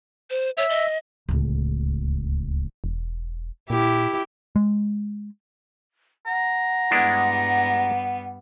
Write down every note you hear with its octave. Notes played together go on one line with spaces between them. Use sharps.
C5
C#5 E5
D#5
D1 C#2
E1
A#2 E4 G4
G#3
F#5 A#5
G2 G3 G#3 B3 D4 E4